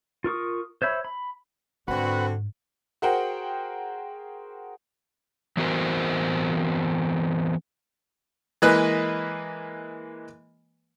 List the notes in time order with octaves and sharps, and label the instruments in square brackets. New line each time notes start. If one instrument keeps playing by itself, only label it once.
[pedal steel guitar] F4 A#4 C#6 D#6
C5 C#5 E5 B5
B5
[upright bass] G#2 [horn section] D3 F#4 [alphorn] C4 [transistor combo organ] B4 F#5
[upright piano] F#4 G#4 A#4 C5 F#5 G5
[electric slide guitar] E3 B3 C4 F#4 A#4 C5
[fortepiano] E3 G#3 A#3 B4 D#5 F#6